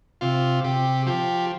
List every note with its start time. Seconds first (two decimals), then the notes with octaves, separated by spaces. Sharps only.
0.21 C3 F4
0.64 C3 G4
1.06 F3 G4